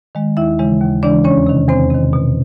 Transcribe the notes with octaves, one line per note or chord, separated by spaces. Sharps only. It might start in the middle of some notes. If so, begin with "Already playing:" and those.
D#3 G#3
D#2 E4 E5
C#3 E3 G#3
D#2
C#3 E3 G#3 D4 D5
E2 C#4 C#5
C3 D#3
E2 C4 C5
C3 D#3
B2